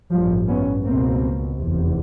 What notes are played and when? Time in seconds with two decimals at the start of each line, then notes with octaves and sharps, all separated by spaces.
0.12 A1 G2 F3 G3
0.48 B3 C#4
0.85 C#2 B2 A#3 C4
1.58 F1 E2 C3